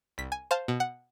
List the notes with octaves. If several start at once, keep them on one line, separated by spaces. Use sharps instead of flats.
C2 B6
G#5
C5 F5 A5
B2
F#5